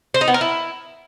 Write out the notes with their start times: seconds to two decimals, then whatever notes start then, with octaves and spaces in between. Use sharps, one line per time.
0.14 C5
0.21 D#4
0.28 B3
0.34 A#4
0.41 E4